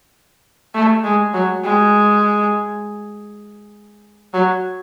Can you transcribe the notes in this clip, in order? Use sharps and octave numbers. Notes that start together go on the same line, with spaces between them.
A3
G#3
F#3
G#3
F#3